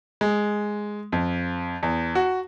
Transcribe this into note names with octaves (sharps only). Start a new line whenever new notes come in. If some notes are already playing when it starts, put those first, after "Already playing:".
G#3
F2
E2
F#4